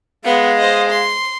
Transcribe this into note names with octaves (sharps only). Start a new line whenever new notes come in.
G#3 B3 F5
C5 D#5
C6